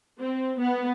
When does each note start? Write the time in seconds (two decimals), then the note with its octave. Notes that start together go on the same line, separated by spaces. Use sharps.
0.20 C4
0.61 B3